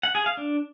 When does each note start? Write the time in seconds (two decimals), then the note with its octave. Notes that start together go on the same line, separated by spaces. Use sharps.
0.03 F#5
0.15 G#4
0.26 F5
0.37 D4